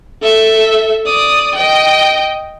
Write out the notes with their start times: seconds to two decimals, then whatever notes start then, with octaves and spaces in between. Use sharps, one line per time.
0.22 A4 E5
1.06 D5 D#6
1.55 D#5 G5